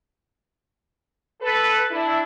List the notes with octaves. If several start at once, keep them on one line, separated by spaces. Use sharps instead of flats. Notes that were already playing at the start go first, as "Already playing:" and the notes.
A4 B4
D4 E4